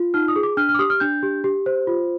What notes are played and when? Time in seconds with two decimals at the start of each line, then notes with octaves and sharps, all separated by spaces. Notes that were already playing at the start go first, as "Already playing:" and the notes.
Already playing: F4
0.14 D#4 F6
0.28 D#6
0.36 G#4
0.43 D6
0.57 D4 F6
0.69 F6
0.75 D6
0.79 G4 D#6
0.90 F6
1.00 D4 G6
1.23 G4
1.44 G4
1.66 C5
1.87 F4